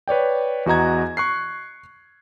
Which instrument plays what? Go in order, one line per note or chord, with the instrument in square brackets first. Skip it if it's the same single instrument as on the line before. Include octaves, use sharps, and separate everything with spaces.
[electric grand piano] B4 C#5 D5 G5
E2 F#4 D#5 A#5 G#6
C#6 F#6 C7